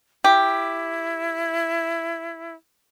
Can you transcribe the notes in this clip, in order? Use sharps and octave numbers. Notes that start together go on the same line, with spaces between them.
E4 G4